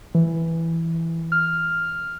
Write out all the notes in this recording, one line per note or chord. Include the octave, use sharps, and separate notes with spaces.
E3
F6